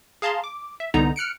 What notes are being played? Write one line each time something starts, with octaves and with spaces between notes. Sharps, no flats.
G#4 F5 A5 A#5 C6
D6
E5
C2 D3 B3 D#4 A#5
F6 F#6 C#7 D7